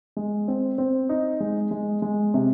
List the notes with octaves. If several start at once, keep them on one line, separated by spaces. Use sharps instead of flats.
G#3
C4
C4
D#4
G#3
G#3
G#3
C3